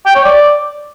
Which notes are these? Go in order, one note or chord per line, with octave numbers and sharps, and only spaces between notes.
G5
C#5
D5